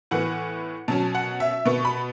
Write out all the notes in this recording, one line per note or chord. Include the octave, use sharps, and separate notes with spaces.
A2 E3 B3 F#5
B2 F#3 C#4 A5
F#5
E5
B2 B3 C#6
B5